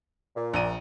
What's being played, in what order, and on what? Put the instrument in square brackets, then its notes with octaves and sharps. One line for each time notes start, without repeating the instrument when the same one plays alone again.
[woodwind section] A#2
[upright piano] A#1 A#5 D#7